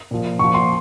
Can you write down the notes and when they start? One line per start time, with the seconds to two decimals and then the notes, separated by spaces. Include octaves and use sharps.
0.11 A#2 F3
0.39 A#2 F3 C#6
0.54 C6